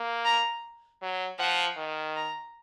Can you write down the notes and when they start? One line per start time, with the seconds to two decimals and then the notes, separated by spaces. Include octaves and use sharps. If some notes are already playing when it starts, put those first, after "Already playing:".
Already playing: A#3
0.25 A#5
1.02 F#3
1.39 F3 F#5
1.77 D#3
2.16 A#5